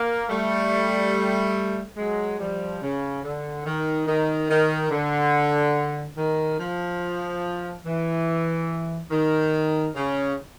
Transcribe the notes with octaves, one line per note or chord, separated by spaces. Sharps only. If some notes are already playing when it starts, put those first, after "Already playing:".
Already playing: A#3
G3 A3
F#3 G#3
F3 G3
C#3
D3
D#3
D#3
D#3
D3
D#3
F3
E3
D#3
C#3